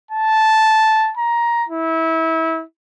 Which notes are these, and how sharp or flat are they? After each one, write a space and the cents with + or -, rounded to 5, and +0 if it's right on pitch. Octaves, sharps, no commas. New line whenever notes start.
A5 -5
A#5 +15
E4 -25